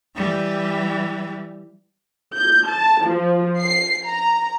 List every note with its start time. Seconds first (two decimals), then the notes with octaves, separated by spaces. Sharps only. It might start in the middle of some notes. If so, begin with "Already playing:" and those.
0.16 E3 G3
2.36 G6
2.69 A5
3.06 F3
3.60 C7
4.07 A#5